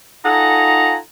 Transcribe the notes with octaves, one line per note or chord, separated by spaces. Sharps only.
D#4 F4 A4 F#5 G#5 A#5